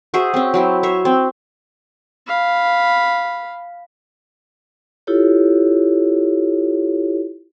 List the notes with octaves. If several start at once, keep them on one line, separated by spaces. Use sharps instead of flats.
F#4 G#4 C5 E5
C4 C#4
F#3 C4 E4
C5 C#5 E5
C4
F5 B5
E4 F4 G4 A4 C#5